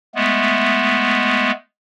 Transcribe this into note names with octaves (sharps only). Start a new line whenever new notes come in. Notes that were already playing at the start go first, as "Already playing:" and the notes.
G#3 A3 B3